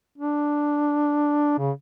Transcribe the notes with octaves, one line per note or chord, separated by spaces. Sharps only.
D4
C#3